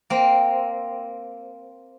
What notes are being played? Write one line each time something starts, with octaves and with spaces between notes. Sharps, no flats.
A#3 C4